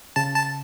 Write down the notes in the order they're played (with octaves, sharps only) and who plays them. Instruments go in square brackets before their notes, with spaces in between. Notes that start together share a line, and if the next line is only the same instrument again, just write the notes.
[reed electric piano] C#3 [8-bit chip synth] A5
[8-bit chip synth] A5